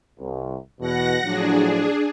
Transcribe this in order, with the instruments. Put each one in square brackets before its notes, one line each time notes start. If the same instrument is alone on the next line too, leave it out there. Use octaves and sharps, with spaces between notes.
[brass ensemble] C2
[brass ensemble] E2 B2 [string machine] F#5 A#6
[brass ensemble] A2 F3 F#3 [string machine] D4 G#4